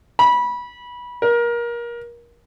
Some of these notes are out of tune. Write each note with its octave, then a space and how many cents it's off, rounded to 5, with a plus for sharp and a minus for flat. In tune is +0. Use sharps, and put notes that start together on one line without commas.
B5 -20
A#4 +25